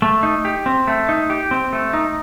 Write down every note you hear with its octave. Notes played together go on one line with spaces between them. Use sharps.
A3
D#4
G4
C4
A3
D#4
G4
C4
A3
D#4